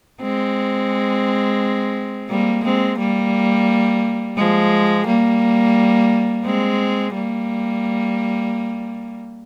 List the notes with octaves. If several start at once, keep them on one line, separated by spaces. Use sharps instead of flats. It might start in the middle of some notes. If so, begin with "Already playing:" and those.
G#3 C4
G3 A#3
G#3 C4
G3 A#3
F3 G#3
G3 A#3
G#3 C4
G3 A#3